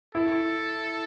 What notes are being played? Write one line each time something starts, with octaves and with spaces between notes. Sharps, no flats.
E4 A4